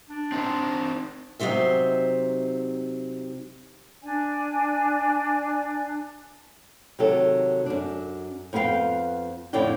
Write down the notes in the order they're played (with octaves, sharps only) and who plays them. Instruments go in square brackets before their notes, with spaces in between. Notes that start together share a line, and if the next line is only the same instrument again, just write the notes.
[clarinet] D4
[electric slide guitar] C4 D#4 C5
[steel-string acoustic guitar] C3 F#3 D#4 C5 E5
[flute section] D4 D5 G#5
[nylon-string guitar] C3 D#3 F#3 A4
F#2 D4
F2 B3 D#4 G#4 F5 G5
F2 A2 D3 D5 G5